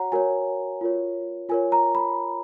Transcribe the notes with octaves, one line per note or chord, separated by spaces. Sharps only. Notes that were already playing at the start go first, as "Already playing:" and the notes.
Already playing: F#4 C#5 F#5 A#5
F#4 A#4 C#5 G#5
F4 A#4 C#5
F4 A#4 C#5 G#5
A#5
B5